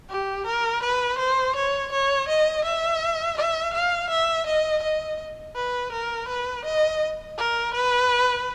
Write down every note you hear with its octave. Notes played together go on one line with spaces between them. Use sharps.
G4
A#4
B4
C5
C#5
C#5
D#5
E5
E5
F5
E5
D#5
D#5
B4
A#4
B4
D#5
A#4
B4